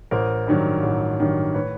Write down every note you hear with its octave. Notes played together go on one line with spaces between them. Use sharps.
A1 A#4 C5
G2 D#3 F#3
A1
G2 D#3 F#3
A2 B4 C#5